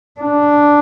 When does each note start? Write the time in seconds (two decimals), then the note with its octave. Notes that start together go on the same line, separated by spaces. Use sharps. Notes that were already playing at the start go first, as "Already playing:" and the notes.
0.20 D4